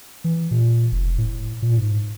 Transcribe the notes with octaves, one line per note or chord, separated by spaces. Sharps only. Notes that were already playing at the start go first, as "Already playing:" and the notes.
E3
A#2
F1
A2
A#2
G#2